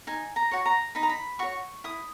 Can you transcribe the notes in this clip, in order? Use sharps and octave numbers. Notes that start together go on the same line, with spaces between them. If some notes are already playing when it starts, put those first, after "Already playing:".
D#4 G#5
A#5
F#4 C#5
A#5
D#4 B5
A#5
B5
F#4 C#5 C#6
E4 D#6